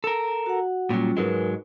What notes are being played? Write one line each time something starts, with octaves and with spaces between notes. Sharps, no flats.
A4 A#4
F#4 F#5
A#2 F#3 G3 C#4 F4
G#2 F#3 G#3 A#4 B4